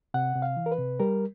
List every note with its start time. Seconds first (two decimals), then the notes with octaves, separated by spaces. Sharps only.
0.14 C3 F#5
0.35 C3
0.42 F5
0.57 E3
0.66 A#4
0.72 B4
0.78 C3
1.00 G3 A#4